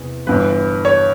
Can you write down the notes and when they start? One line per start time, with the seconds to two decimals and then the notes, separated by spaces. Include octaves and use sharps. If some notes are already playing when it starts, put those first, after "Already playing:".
Already playing: E2 C3
0.27 G1 G2 E3 B4
0.85 C#5